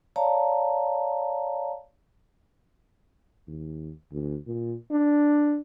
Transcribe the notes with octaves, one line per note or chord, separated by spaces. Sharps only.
C#5 D5 F5 A5 A#5
D#2
D2
A#2
D4